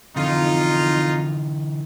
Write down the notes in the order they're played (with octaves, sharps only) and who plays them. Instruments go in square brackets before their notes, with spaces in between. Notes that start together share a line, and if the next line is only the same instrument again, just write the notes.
[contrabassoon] F2 [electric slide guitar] D3 E3 [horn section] D#4 F4